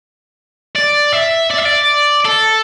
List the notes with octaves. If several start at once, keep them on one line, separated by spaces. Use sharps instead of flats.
D5
E5
D5
E5
D5
A4